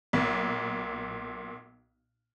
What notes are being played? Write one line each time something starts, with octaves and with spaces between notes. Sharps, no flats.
B1 A#2